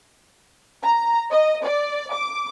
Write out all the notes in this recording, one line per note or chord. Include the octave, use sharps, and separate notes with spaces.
A#5
D#5
D5
D6